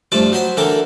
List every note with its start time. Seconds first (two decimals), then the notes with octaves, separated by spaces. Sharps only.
0.12 G2 F3 A3 C5 D5 D6
0.32 F#3 C5 G5 B5 C6
0.57 D3 E3 D4 A4 A#4 G5